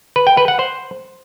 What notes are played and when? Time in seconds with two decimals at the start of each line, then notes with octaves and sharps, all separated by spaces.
0.16 B4
0.27 G5
0.37 B4
0.48 F#5
0.59 C5